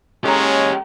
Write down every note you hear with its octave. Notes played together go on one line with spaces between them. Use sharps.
G#3 C#4 G4 A4 C#5 A#5